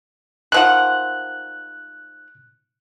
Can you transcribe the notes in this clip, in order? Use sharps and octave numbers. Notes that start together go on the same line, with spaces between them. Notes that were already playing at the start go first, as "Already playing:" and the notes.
D#3 F3 F#5 F#6